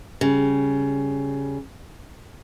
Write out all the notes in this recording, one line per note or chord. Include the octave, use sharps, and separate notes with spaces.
C#3 G3